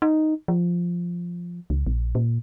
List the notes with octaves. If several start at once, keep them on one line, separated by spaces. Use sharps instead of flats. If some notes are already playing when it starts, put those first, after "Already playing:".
D#4
F3
C#2
A#1
A#2